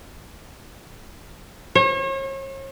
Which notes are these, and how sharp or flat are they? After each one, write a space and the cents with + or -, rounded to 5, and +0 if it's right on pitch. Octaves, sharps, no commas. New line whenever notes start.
C#5 -40